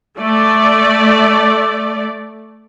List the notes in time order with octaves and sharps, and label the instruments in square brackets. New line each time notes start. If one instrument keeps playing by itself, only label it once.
[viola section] A3 D5